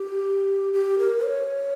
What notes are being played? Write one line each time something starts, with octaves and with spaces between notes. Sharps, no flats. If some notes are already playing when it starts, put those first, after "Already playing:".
Already playing: G4
G4
A#4
C#5